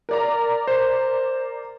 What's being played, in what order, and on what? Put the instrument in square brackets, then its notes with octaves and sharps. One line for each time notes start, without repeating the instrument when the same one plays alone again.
[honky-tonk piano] A#4 D5 A#5
[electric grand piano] C5